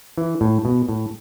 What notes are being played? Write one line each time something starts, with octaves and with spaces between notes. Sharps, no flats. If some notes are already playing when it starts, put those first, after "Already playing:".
E3
A2
B2
A2